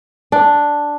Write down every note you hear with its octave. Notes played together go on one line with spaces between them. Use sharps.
D4